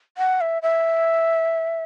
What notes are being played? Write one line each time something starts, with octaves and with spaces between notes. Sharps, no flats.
F#5
E5
E5